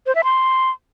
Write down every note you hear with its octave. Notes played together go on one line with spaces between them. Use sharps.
C5
E5
C6